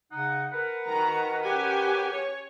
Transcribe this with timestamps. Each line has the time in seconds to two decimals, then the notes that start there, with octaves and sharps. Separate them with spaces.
0.11 C#3 D#4 F#5
0.52 A#4 B4 F#5
0.87 D#3 F#4 A#5
1.44 C#4 G4 G#5
2.13 C#5